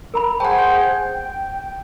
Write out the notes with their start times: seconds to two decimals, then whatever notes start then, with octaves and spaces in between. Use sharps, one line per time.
0.14 A#4 A#5 B5
0.40 G#4 C5 F#5 G5 A5 C#6
0.58 G#5 G6
1.14 G5